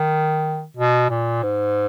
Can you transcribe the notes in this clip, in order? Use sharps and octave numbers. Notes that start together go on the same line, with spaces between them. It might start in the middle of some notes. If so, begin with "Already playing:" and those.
Already playing: D#3
B2
A#2
G#2